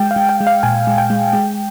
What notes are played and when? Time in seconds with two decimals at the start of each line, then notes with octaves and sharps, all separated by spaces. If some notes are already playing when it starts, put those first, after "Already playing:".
Already playing: G#3 G5
0.11 F5
0.16 G#3
0.29 G5
0.41 G#3
0.47 F5
0.63 A#2 G#5
0.87 G#3
0.98 G5
1.10 G#3
1.33 G#3